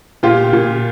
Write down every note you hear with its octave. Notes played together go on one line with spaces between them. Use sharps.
A#2 F4 G4
A#2